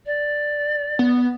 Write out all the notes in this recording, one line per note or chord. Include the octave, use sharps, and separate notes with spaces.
D5
B3